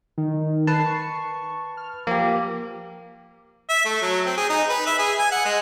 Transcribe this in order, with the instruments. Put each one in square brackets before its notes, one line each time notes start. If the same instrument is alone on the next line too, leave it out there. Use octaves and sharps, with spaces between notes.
[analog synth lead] D#3
[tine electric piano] B4 A5 [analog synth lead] C7
[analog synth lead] C#6
F6
[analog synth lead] F3 [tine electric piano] A#3 G4
[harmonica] E5
A3
F#3
C4
G#4
D#4
B4
E5
G#4
G#5
F#5
G#3